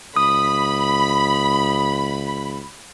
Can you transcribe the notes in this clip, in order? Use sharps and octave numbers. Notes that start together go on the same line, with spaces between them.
C#2 B5 D#6